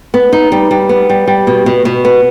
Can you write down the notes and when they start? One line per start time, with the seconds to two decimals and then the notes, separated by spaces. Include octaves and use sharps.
0.14 B3
0.33 D#4
0.52 G3
0.71 G3
0.89 B3
1.09 G3
1.27 G3
1.47 B2
1.66 B2
1.85 B2
2.05 B3